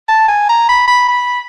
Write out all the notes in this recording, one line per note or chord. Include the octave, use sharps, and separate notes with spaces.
A5
G#5
A#5
B5
B5
B5